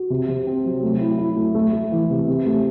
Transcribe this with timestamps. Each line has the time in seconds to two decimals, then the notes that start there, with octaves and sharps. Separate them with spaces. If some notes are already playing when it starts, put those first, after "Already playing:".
Already playing: F#4
0.10 C3
0.29 C3
0.47 C4
0.64 F#3
0.83 A3
1.01 E4
1.18 E4
1.36 A3
1.55 A3
1.73 A3
1.92 E3
2.10 C3
2.28 C3
2.46 A3